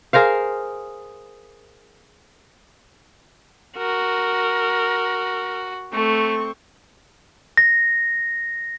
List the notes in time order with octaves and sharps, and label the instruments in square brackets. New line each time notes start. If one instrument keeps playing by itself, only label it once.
[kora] G#4 A#4 C5 F5
[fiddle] F#4 [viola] A#4
[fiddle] A3 [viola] C4 C#6
[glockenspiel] A#6